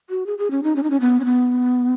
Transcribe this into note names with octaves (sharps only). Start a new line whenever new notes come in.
F#4
G#4
G#4
C#4
D#4
C#4
D#4
C#4
B3
C#4
B3